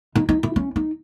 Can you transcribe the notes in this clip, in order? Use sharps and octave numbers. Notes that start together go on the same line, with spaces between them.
D#4
D#4
E4
C#4
D#4